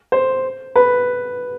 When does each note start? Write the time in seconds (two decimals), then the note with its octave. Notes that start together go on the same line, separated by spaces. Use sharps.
0.12 C5
0.76 B4